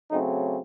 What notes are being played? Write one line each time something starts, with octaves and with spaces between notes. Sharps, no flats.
C#3 F#3 A3 C4 D#4